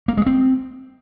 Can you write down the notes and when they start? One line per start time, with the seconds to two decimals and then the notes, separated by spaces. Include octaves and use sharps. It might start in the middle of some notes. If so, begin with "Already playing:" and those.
0.08 A#3
0.17 G#3
0.26 C4